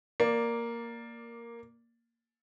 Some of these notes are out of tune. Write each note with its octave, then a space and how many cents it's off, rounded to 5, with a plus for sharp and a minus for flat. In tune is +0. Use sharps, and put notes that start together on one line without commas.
A#3 +0 D5 +0